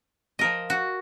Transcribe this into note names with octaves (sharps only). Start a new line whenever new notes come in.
F3 A#4 D#5
F#4